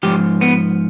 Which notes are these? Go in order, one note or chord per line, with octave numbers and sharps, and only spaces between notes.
G#2 F3 G4
B3